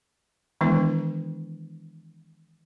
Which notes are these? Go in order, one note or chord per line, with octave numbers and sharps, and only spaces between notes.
D#3 E3 G#3 B3 D4 E4